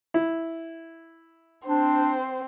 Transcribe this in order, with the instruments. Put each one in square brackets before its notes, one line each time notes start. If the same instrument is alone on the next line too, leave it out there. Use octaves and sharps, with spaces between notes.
[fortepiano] E4
[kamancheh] C4 C5 [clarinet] D4